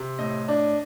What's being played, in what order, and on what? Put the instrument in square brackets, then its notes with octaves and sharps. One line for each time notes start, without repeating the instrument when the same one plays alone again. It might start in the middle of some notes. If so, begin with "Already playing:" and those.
Already playing: [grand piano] C3
A2 D#5
D4